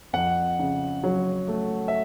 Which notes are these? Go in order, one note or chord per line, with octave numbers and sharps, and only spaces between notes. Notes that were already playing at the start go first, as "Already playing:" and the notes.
F2 F#5
C#3
F#3
A3
E5